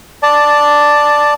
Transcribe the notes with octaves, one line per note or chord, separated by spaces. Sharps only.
D5 A5